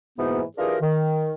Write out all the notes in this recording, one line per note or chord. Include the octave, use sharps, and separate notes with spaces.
G#2 B2 E3 A#3 B3 D#4
E3 D4 F4 G4 G#4 A#4
D#3